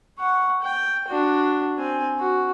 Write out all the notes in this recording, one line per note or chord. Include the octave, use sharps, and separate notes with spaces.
F#5 C#6
G5
D4 F#4
C4 G#5
F#4